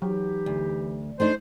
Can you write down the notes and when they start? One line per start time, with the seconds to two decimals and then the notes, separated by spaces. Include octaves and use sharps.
0.02 E3 F#3 D#4 G4
0.46 D2
1.20 A3 D4 D#4 C5